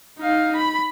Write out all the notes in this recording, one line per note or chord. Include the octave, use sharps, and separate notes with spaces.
D#4 F5
B5